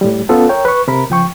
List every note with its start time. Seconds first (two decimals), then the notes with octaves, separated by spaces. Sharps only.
0.01 A2 G3
0.29 B3 C#4 F4 A4
0.49 A#4 C#5 G5
0.65 B4 C#6
0.88 C3 A#4 B5
1.10 C#2 F3 G5 C#6